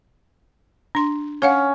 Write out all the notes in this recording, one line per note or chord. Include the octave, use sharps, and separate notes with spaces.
D4 C6
C#4 C#5 F5 F#5